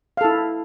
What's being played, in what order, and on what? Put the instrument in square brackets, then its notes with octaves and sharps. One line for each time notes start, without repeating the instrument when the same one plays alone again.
[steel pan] F5
A4
E4